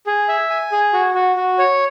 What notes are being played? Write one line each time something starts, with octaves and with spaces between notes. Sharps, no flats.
G#4
E5
G#5
G#4
F#4
F#4
F#4
C#5